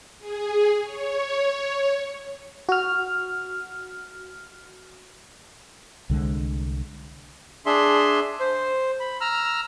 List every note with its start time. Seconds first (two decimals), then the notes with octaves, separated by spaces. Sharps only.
0.19 G#4
0.82 C#5
2.69 F#4 F6
6.10 C2 D3 G#3
7.66 D4 G#4 E5 C6
8.40 C5
9.00 B5
9.21 A#5 E6 F6